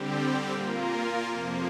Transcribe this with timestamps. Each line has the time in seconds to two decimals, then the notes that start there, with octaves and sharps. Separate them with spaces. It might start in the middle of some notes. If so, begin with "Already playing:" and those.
Already playing: D3 G3 C4 G4
0.51 A#2 A#3 F4 A#4
1.26 F2 C3 F3 A#3